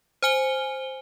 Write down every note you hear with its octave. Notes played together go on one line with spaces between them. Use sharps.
C5 G#5 G7